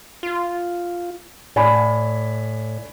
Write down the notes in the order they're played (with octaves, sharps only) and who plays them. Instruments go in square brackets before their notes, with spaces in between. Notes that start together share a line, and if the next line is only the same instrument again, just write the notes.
[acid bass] F4
[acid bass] A2 [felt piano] D5 G#5 B5